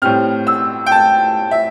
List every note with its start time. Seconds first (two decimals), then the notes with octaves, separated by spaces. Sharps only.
0.02 A2 G3 C4 F6
0.47 E6
0.86 G5
0.92 A5
1.51 E5